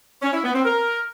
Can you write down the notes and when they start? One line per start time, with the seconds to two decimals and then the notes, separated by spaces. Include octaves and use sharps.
0.22 C#4
0.33 E4
0.43 B3
0.54 C4
0.64 A#4